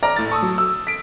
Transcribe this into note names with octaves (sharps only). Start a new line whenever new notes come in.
D5 A#5 F6 A#6
A2 A6
A5 C#6 D#6 E6
F#3
E6
B6 D7